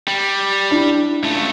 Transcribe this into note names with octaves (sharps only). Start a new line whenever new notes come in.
G3
D4 E4
C#2 A3